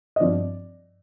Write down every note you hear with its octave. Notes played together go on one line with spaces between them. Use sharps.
D#5
G2 F3 C4 D5